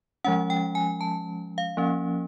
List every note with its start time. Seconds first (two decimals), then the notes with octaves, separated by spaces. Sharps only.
0.24 F3 G#3 C#4 F#5
0.50 G5
0.75 G#5
1.01 A5
1.58 F5
1.77 F3 A#3 C#4